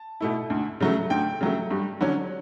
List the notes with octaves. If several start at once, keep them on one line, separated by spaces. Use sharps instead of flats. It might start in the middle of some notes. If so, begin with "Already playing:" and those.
Already playing: A5
B2 A3 E4
D2
C#3 F#3 A3
D2 G5
C#3 F#3 A3
G2
D3 F#3 C#4